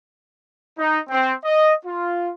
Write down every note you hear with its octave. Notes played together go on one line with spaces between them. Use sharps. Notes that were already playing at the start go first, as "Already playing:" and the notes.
D#4
C4
D#5
F4